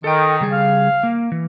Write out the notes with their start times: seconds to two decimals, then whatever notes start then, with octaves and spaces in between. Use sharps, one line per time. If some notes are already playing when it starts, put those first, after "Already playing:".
0.04 D#3 A4 G5
0.41 C#3 G3 G#4
0.53 F5
1.03 A#3
1.32 E3